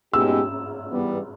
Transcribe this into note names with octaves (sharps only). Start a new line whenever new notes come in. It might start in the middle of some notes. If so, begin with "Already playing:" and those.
B2 G#3 B3 D#4 G4 E6
E3 G3 B3